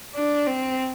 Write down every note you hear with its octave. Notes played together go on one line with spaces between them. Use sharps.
D4
C4